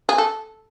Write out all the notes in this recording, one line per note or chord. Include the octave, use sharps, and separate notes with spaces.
G#4
A4